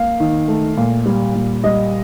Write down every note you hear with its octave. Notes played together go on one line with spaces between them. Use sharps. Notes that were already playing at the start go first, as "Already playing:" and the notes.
Already playing: A#3 F5
D#3
A3
A#2
G3
A#2
G3 D#5